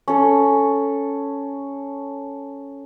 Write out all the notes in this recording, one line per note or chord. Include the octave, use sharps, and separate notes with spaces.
C#4 A4